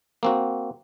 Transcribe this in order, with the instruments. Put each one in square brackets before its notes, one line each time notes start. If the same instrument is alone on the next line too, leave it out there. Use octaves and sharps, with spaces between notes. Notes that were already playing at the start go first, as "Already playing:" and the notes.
[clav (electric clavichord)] A#3 C4 F#4